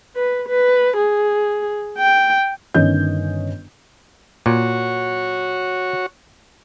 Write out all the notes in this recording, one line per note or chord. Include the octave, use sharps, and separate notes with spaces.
B4
B4
G#4
G5
G1 D#3 C#4 D#5 G6
A#2 F#4 C#5